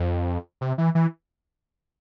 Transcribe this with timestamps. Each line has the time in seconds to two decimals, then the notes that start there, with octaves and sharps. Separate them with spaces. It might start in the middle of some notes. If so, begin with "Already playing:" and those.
Already playing: F2
0.61 C3
0.78 E3
0.95 E3